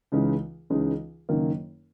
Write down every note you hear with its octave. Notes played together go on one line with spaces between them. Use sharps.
C#2 C#3 E3 G#3 D#4
C#2 C#3 E3 G#3 D#4
F#1 F#2 D#3 A#3